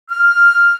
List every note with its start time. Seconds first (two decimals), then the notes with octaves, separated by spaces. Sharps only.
0.09 F6